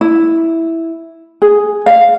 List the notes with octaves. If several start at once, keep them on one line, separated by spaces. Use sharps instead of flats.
E4
G#4
F5